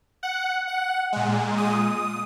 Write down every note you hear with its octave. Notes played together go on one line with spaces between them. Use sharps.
F#5
F#5
A#2 G#3
D#6